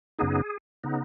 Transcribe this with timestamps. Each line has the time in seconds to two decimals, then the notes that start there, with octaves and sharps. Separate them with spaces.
0.19 F#2 C#3 B3 D#4 G#4
0.84 C#3 B3 D#4